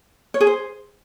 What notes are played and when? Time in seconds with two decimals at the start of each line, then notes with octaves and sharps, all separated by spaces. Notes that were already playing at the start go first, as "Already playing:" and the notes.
0.34 C#5
0.41 G#4
0.47 C5